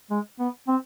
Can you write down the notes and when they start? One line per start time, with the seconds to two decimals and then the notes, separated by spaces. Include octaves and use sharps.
0.11 G#3
0.39 B3
0.68 C4